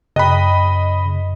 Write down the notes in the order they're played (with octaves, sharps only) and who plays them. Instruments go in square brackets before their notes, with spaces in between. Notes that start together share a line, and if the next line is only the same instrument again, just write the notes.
[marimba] F#2 G5 F#6 [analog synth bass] C#3 [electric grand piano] D#5 B5